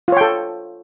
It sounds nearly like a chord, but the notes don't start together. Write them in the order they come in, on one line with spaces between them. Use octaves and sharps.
F4 C#5 G5 A4